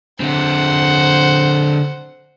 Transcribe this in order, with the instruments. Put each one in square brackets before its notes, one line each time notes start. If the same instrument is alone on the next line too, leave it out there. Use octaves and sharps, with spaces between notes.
[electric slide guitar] D3 C4 [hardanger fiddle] C5 F#5